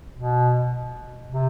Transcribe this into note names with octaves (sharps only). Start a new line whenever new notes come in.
B2
C3